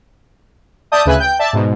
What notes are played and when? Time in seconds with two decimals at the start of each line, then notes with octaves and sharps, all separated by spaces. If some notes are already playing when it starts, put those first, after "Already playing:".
0.92 D5 E5 A5 D#6 G6
1.05 D2 C#3 B4 E5 G#5 F#6
1.19 G5 G6
1.39 D5 E5 A5
1.53 G#2 B2